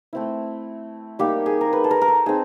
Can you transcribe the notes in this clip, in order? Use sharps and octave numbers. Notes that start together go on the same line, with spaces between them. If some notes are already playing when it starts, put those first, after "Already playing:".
A3 C4 E4
G3 A#3 D#4 G4
G#4
A#4
B4
A4
A#4
A#4
A4
C4 D#4 G#4